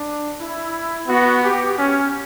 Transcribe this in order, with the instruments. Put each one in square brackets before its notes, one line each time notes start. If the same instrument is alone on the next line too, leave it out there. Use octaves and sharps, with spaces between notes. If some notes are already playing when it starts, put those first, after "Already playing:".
Already playing: [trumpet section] D4
E4
[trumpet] B3 [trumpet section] F#4
[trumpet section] G4
C#4